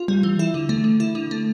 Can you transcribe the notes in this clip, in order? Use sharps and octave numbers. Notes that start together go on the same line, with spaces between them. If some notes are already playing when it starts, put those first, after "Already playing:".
Already playing: F4
G3
E3
E4
D3
A3
D3
E4
D3
A3